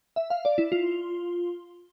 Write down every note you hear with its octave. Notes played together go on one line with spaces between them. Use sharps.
E5
F5
D5
E4
F4